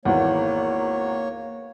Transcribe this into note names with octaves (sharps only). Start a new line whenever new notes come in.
G#1 E2 A#3 C#5